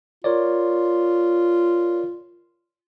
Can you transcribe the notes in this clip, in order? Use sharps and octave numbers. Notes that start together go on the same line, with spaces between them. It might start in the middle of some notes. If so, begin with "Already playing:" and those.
F4 A#4 C#5 D5